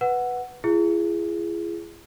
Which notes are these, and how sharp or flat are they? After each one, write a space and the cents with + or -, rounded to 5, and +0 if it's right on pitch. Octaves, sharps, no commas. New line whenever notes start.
B4 +0 F#5 +0
E4 +45 G#4 +0